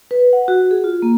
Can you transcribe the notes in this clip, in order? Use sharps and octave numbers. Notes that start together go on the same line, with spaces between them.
B4
F#5
F#4
G#4
F4
A#3